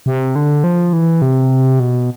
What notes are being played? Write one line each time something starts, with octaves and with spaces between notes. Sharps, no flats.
C3
D3
F3
E3
C3
B2